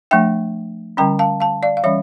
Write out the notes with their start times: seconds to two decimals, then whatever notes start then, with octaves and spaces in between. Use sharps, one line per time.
0.11 F3 A3 D4 E5 G5
0.97 D3 G3 C#4 G5 A#5
1.19 F5 A5
1.40 F5 A5
1.63 D5 F5
1.77 F5
1.84 E3 G3 C#4 C#5 E5